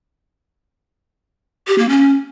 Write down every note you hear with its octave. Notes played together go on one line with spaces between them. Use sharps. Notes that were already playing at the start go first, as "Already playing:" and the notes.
G4
A#3
C#4